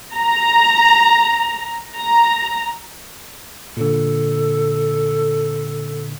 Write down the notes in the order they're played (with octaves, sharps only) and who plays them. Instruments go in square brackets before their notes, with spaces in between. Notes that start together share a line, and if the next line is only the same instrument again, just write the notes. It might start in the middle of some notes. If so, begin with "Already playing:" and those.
[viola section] A#5
A#5
[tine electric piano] A#2 D3 [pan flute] A4